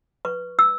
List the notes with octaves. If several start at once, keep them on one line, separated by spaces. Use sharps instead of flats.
B4 C#6
E6